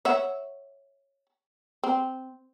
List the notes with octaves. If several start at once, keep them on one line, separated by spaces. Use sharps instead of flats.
C#5 E5 F#5
C4